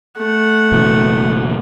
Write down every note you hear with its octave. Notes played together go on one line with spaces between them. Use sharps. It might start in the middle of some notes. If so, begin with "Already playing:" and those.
A3 F#5
F#1 B2 E3